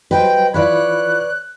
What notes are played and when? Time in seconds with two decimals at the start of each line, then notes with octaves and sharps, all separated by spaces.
0.11 F#3 G3 B4 C5 D#5 G5
0.54 E3 F4 B4 C#5 D5 B5 F#6